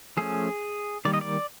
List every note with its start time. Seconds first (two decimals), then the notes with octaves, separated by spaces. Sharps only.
0.17 F3 A3 C#4 G#4
1.05 D#3 G3 A#3 D5
1.14 D#5
1.21 D5